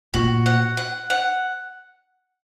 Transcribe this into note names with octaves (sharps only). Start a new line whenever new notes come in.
A#2 F#4
F#5
F#5
F#5